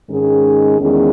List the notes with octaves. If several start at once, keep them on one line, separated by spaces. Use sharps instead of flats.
G#2 D#3 G#3 C#4 G#4
E2 D#3 G#3 C#4 G#4